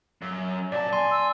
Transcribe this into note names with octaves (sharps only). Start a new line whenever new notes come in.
F#2
A#2 D5 A5
G#5 C6
E6